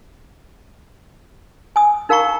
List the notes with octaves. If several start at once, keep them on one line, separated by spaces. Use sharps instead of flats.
G#5 D#6
D#4 A#4 F5 G5 A#5 C#6